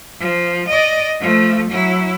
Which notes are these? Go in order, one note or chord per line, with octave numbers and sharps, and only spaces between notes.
F3
D5 D#5
F3 A3
F#3 E4